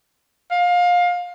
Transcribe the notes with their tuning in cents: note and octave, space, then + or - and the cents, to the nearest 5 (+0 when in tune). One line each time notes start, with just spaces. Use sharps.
F5 +25